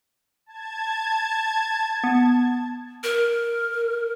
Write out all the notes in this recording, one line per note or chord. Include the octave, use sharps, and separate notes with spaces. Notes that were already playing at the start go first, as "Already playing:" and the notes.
A5 G#6
B3
A#4